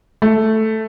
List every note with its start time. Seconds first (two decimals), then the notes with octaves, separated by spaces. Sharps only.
0.22 A3